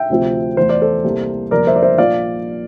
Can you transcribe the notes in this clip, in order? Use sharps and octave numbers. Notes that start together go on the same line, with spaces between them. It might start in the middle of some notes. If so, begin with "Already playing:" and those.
Already playing: E5 G5
D2 C3 F3 C4 F4
E2 C3 E3 A3 C5
D5
A4 C5
C2 C3 G3 A#3
G1 F2 C3 G3 A#3 A#4 D5
C5 E5
D5
C5 E5
A#1 A#2 F3 D5 F5